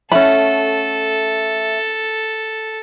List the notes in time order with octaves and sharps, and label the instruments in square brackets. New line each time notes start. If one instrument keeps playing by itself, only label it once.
[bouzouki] A3 F#5 [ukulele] C#4 B5 [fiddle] A4